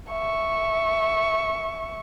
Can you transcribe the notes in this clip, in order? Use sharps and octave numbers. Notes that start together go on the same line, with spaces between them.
E5 C#6